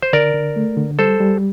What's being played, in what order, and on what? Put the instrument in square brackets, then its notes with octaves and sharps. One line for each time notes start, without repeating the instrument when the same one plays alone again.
[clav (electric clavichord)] C5
[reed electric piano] D3 [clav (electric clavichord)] A#4 D5
[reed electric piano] D3
A3
D3
[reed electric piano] G3 [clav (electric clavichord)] A4 C5
[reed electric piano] G3